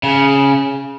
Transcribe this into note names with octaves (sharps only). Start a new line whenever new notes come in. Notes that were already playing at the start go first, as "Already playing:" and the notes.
C#3